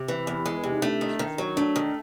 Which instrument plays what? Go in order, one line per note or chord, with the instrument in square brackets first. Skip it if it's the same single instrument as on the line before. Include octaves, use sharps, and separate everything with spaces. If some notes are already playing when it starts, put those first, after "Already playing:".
Already playing: [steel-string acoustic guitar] C3
E3
E2
G#3
C3
[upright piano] D#4
[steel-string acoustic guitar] A3 [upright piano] D4
[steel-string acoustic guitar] D#3
D#3
F#3
[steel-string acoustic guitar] A3 [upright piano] D4
[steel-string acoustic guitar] D#3